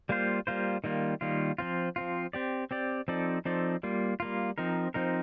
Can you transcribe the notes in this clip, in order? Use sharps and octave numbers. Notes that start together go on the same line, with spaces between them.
G3 A#3 F4 C5
G3 A#3 F4 C5
D#3 G3 A#3 F4
D#3 G3 A#3 F4
F3 C4 F4
F3 C4 F4
C4 G4 D5
C4 G4 D5
F3 C4 D#4 A4 D5
F3 C4 D#4 A4 D5
G3 A#3 F4
G3 A#3 F4
F3 C4 D#4 A#4
F3 C4 D#4 A#4